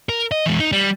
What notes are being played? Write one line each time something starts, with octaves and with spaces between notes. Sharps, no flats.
A#4
D#5
E3 G#3
D#4
G3